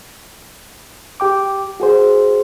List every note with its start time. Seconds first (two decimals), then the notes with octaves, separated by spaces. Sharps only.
1.20 G4 G5 D6
1.80 F#4 G#4 C5